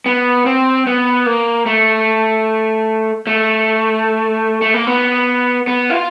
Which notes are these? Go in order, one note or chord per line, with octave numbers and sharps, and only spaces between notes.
B3
C4
B3
A#3
A3
A3
A3
A#3
B3
B3
E4
F4